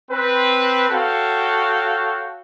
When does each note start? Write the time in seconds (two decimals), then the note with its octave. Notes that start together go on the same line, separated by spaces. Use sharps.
0.11 C4 B4
0.90 F#4 A4 C#5 F5 G5